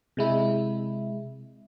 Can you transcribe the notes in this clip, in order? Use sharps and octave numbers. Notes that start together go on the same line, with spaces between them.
C3 G#3 E4